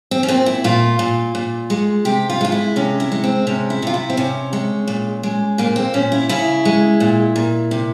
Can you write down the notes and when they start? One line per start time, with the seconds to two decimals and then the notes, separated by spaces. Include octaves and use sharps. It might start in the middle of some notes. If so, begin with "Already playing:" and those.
0.11 C4
0.23 C#4
0.28 A#2 C4
0.46 E4
0.64 A#2 F4
0.99 A#2
1.35 A#2
1.70 G#3
2.05 C3 G4
2.30 F4
2.41 G#3 F4
2.52 E4
2.76 C3 C#4
3.00 E4
3.12 G#3
3.24 C4
3.47 C3 C#4
3.70 E4
3.82 C3 F4
3.94 E4
4.10 C4
4.17 C3 C#4
4.53 G#3
4.87 A#2
5.23 G#3
5.58 A#2 A#3
5.76 C4
5.94 A#2 C#4
6.12 E4
6.29 C#3 E4
6.65 G#3
7.00 A#2
7.36 A#2
7.71 C3